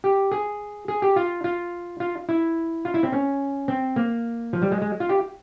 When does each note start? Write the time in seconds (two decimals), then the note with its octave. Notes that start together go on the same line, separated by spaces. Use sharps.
0.04 G4
0.32 G#4
0.88 G#4
1.02 G4
1.16 F4
1.44 F4
2.00 F4
2.29 E4
2.85 F4
2.94 E4
3.03 C4
3.12 C#4
3.68 C4
3.96 A#3
4.53 F3
4.62 G3
4.72 G#3
4.82 G#3
5.00 F4
5.09 G4